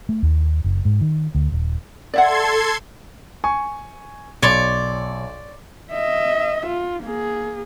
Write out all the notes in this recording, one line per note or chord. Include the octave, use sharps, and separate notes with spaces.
A3
D#2
F#1
G#2
D#3
D2
D#1
A4 D5 E5 F#5 C6 G#6
G#5 C#6
B1 C#5 D5 C6
D#5 E5
F4
A#3 G#4